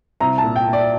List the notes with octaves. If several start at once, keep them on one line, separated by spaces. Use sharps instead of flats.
C2 A#5
A5
A#2
G5
A#2
D5